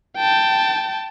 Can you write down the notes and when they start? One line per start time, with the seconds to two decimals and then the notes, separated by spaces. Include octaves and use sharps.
0.17 G5 A5